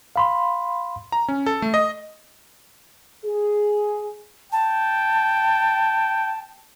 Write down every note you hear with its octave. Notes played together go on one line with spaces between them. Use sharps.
F5 B5 C6
A#5
C#4
A4
A3
D#5
G#4
G5 A5